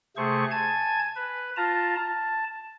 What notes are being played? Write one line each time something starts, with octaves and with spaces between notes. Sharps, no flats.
C3 A3 G#4 C5 C#6
G#5 A5 G#6
B4
F4 A5 A#5
A5